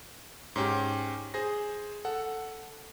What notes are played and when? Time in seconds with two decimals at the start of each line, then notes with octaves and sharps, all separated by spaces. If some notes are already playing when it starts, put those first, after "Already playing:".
0.56 G#2 C#4 G4
1.34 G#4 C5 A#6
2.05 A4 F#5